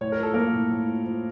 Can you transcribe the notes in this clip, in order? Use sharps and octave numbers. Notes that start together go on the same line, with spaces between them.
A2 C#5
A#4
F3 A4
F3 A#3 A#4
A2
A2
F3
F3